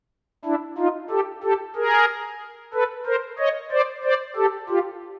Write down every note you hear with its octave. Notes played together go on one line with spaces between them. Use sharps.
D4 E4
D#4 F4
G4 A4
G4 A4
G#4 A#4
A4 B4
A#4 C5
C#5 D#5
C5 D5
C5 D5
G4 A4
F4 G4